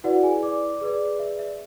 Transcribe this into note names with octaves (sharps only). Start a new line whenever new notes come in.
E4 F#4 B4 D5 F#5
G#4 G#5
D5 D6
G#4 B4 D5
E5
E5